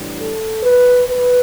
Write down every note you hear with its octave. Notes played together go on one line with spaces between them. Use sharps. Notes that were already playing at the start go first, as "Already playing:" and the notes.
Already playing: A2 E3 G3 D4
A4
B4
B4